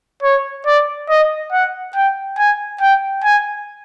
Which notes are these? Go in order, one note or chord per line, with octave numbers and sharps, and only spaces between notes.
C#5
D5
D#5
F#5
G5
G#5
G5
G#5